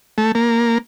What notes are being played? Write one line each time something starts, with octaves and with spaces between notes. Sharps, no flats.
A3
A#3